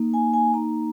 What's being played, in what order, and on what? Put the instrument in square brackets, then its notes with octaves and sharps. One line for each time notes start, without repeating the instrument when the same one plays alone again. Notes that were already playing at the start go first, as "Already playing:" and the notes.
Already playing: [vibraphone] A#3 D#4
G#5
G#5
A#3 D#4 A#5